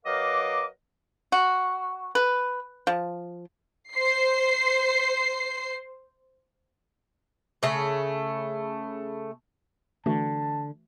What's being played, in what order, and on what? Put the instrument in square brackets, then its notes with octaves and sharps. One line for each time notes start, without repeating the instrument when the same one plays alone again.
[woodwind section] F#3 A#4 B4 D#5 F5 D6
[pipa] F#4
B4
F3
[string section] C5 C7
[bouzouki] C#3 A3
[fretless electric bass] D3 [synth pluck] E3 A3 F#4 [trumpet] A5